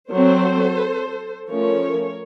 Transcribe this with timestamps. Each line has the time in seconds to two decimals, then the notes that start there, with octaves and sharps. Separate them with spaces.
0.11 F#3 C4 A4 C5
1.48 F3 A3 C#4 A#4 C#5